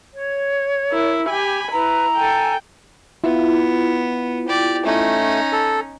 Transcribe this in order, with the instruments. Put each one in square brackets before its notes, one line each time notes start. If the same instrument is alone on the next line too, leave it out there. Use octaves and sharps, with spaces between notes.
[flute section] C#5
[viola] E4 A#4
[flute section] G4 [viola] G#5 B5
[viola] E4 [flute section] B4 [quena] A#5
[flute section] A4 G#5 [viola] G5
[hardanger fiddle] B3 [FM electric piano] E4 F4
[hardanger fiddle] G4 D5
[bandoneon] A3 [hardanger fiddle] C#4 D#4
[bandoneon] A4